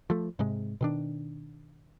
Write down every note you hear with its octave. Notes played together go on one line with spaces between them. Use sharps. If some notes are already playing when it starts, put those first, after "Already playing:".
F3 A3
G#2 C3 G#3
B2 D#3 D4